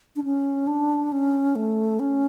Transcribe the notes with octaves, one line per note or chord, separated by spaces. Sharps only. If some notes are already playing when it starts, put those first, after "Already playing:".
D4
C#4
D4
C#4
A3
C#4